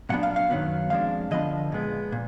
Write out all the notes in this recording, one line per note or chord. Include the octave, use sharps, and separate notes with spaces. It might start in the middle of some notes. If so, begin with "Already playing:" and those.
A#2 F#3 B3 D4 F#5
F5
F5
F#2 D#3 F#3 B3
F2 F3 G#3 D4 F5
D3 F3 B3 D4 D#5
A#2 G#3 B3
A#2